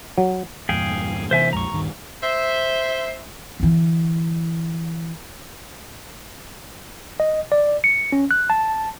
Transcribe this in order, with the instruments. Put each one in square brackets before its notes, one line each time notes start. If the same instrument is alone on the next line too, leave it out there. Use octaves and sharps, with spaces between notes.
[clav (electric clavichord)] F#3
[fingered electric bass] E2 G2 A#2 [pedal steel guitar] G#4 F5 G5
[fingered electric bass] C3 E3 B3 [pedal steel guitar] C5 E5 G#5
[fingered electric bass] A#1 F2 G#3 [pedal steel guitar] A#5 C#6
[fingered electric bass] D#1 G2 D#3
[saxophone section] C5 E5
[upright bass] D3 E3
[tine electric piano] D#5
D5
C#7
C#4
F#6
A5